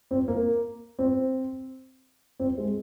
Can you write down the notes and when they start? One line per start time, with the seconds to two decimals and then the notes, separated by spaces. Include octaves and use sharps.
0.11 C4
0.28 A#3
0.99 C4
2.40 C4
2.58 G#3